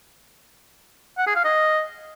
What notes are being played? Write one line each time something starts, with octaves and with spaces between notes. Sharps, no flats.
F#5
G#4
F5
D#5